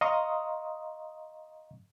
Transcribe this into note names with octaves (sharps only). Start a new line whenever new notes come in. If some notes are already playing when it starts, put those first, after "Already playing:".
D#5 F5 A#5 C6 C#6 D#6